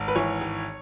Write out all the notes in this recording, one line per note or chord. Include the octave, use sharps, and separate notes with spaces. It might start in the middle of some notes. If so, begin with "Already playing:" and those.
Already playing: G#1
B4
E3 C#5
G#1